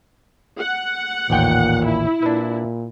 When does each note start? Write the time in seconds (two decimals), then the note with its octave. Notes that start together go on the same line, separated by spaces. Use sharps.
0.60 F#5
1.30 A1 D#2 A#2 G5
1.85 E4
2.22 A#2 D4 B4